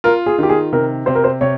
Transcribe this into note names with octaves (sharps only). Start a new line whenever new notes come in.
F4 A#4
G#4
D#3 G4
G#4
C3 A#4
C3 C5
A#4
C5
C3 C#5